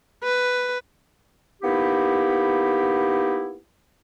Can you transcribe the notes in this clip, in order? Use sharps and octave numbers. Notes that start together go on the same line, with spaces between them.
B4
A#3 B3 D#4 E4 G4